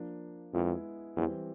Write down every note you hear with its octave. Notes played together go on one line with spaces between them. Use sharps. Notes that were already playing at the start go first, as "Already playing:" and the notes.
Already playing: F3 A#3 D4
F2 G#3 B3 E4 G#4
E2 E3 G3 C4